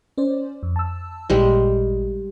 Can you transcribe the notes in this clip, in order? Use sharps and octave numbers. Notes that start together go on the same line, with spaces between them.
C#4 C5 D5
F2
A5 E6
A1 A#2 G3 G#3